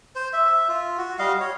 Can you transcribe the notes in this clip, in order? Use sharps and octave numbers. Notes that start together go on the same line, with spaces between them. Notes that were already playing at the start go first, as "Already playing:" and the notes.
C5
E5
F4
F#4
G3 D#5 F5
C#5